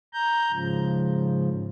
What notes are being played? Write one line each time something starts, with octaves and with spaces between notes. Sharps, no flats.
A#5 G6
G#2 C#3 F3